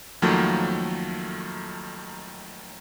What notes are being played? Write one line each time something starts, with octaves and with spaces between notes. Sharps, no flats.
F2 D#3 F3 F#3 A3 A#3